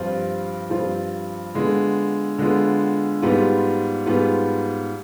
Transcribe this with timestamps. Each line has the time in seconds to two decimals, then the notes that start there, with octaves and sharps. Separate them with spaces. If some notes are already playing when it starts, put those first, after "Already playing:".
Already playing: G2 F3 C4 F4
0.70 G2 F3 C4 F4
1.54 D3 G#3 B3 F4
2.38 D3 G#3 B3 F4
3.22 G#2 G3 B3 F4
4.06 G#2 G3 B3 F4